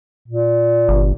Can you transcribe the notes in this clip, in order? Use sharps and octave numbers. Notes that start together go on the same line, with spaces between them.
A#2
G1